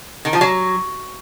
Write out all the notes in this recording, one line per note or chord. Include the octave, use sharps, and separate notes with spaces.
D#3
F3
F#3